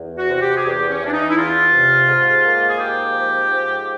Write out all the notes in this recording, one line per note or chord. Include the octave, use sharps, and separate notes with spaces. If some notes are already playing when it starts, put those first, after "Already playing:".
Already playing: E2
F#4
C3
G4
G#4
E2 G4
C#4
E3 D4
D#4
E4
E2 F4
C3
G#2
A#3
G#4
G#2 G4
F3
G#2